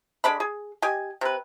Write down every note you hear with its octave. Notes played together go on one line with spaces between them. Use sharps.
D3 G#3 D4 B5
G#4
G4 D#5 G#5
C3 B4